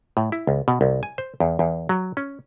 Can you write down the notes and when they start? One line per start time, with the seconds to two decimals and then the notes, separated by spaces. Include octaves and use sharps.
0.17 A2
0.32 E4
0.47 C#2
0.68 B2
0.81 C2
1.03 G#5
1.18 C5
1.40 E2
1.59 E2
1.89 F#3
2.17 C#4